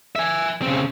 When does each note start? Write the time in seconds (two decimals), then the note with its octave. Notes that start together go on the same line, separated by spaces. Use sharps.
0.16 E5 G#5
0.62 C#3 C4